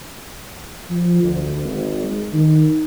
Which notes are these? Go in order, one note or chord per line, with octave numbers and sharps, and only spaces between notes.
F3
D2
G#1
G#3
D#3